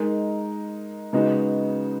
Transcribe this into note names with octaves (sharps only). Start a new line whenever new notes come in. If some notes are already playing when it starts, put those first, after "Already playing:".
Already playing: G#3 D#4 A#4
C#3 G#3 B3 D#4 F#4